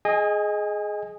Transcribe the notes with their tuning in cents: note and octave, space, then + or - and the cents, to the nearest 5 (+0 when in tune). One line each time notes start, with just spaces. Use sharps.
G#4 +15 D#5 +0 G#5 -30